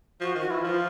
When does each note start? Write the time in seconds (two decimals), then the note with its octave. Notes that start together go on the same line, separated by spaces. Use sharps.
0.21 F3 F#4
0.35 D#3 F#4
0.50 E3 E4
0.59 F3 F4